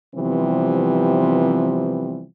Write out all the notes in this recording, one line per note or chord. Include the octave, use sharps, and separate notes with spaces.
C3 E3 F3 G3 B3 C4